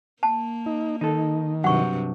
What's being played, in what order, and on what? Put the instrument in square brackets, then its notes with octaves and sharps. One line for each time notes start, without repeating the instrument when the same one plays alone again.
[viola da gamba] A#3 [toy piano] A5
[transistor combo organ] D#4
[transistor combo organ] D#3 [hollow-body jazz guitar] D#4 A4
[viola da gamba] G2 C3 [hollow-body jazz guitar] F#3 [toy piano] F#5 C#6